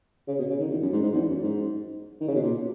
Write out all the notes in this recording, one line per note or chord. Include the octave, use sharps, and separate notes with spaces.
C#3
B2
C#3
D#3
E2
F#2
G#2
G#2
E2
F#2
G#2
D#3
C#3
B2
A#2